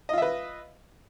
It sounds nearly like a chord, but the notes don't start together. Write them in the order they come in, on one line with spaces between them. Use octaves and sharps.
D#5 F4 E5 B4